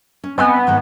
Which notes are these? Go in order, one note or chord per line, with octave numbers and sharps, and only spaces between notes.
C#4
B3 C4 D#5 G#5
G#2 D#3 G#3